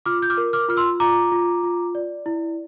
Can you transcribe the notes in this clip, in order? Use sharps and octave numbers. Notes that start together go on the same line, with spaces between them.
F4 D6 F6
G6
D6 F6
A#4
D6 F6
F4 F6
C6 E6
F4 A#5 D6
F4
F4
D5
E4